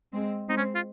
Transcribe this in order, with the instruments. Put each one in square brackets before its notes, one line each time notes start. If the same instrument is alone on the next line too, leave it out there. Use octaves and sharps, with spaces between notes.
[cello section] G#3 C4
[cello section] G#3 C4 [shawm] D#4
[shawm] C#4
F4